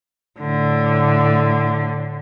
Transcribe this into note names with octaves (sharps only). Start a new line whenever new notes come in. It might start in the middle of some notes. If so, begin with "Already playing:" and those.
A2 D3